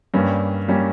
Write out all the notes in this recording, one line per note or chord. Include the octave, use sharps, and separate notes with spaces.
G2 G3 A#3 C#4
G3 A#3 C#4